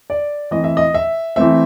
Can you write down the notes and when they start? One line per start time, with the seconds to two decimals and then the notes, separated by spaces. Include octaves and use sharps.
0.10 D5
0.51 E3 A3 C4 D#5
0.64 E5
0.77 D#5
0.94 E5
1.36 E3 A3 C4 E5